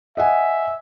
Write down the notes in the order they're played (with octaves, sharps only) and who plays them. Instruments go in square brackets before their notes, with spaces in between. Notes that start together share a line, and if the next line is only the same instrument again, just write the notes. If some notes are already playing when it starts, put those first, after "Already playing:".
[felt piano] D#5 F#5 G#5 [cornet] E5